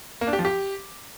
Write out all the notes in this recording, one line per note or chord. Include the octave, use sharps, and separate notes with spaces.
A#3
D4
G4
F3
G4